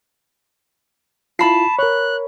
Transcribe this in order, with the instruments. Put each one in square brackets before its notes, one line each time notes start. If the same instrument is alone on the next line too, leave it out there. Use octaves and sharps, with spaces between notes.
[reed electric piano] E4 F4 [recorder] A5 [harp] B5 C7
[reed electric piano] A#4 C#5 [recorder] F#6